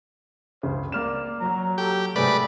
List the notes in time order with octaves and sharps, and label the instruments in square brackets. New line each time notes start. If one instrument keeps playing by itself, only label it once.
[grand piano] C#2 C#3 [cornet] C5
[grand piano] A#3 F6 E7 [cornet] D5
[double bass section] F#3 [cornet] A#5
[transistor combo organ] G4 [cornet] A4
[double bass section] G#2 C3 [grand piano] A3 G#4 [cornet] C#4 [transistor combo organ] B4 D5